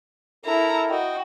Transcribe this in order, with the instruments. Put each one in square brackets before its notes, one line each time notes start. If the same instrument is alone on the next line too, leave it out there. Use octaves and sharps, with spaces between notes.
[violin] E4 A#5 [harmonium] A4 A#4
[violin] F#4 [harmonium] D#5 G5